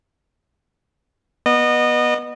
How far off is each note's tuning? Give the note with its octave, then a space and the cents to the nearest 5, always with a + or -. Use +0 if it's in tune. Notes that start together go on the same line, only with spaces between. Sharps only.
B3 -20 D#5 -25